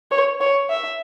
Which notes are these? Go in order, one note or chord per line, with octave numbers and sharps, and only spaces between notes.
C#5
C#5
E5